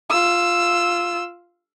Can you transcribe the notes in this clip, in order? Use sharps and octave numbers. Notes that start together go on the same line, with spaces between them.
F4 E6